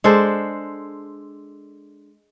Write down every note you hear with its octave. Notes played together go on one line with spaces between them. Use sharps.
G#3 D4 A4 C5